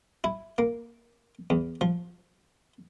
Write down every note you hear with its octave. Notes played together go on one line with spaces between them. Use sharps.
E4
A#3
E2
F3